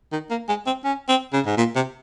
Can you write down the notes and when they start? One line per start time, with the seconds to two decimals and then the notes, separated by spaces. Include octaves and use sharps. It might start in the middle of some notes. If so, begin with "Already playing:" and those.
0.12 D#3
0.30 A#3
0.49 G#3
0.66 C4
0.85 C#4
1.09 C4
1.33 C#3
1.46 G#2
1.57 A#2
1.76 C3